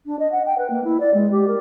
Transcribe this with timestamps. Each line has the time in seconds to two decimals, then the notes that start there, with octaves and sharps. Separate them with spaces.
0.06 D4
0.19 D#5
0.32 F#5
0.46 G5
0.58 B4
0.70 A#3
0.84 E4
1.00 D5
1.14 G#3
1.31 G4
1.47 A#4